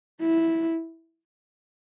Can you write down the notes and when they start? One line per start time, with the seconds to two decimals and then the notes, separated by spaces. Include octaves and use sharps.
0.21 E4